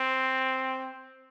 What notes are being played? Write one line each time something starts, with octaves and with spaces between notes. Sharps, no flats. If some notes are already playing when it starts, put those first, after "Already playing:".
Already playing: C4